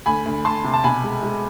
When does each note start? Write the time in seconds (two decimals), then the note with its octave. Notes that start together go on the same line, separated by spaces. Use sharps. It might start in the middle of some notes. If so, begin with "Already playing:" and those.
0.06 D2 G#5 B5
0.25 D2
0.45 D2 A5 C6
0.64 C3
0.73 A5
0.84 B2 G#5 B5
1.04 G#3
1.23 G#3